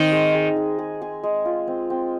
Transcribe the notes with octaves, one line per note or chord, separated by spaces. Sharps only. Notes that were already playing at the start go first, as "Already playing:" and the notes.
Already playing: D#3 C4
G#3
G#3
G#4
G#4
G#4
G#3
F4
C4
C4